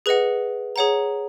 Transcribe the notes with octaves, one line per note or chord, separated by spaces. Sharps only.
G#4 B4 D#5 F#5
G#4 C#5 F#5 A#5